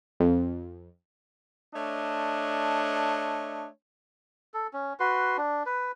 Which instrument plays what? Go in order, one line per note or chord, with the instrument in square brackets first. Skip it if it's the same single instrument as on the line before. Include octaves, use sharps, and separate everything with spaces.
[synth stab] F2
[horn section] A3 D4 C#5 D#5
[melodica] A4
C#4
F#4 B4 C6
D4
B4